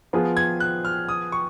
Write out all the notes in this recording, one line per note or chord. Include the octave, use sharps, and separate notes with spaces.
F3 B3 F4 G#4
G#6
F#6
F6
D#6
C#6